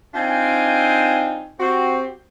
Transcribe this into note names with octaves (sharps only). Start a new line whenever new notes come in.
C4 D4 D#4 F4 G5 G#5
C4 F#4 G4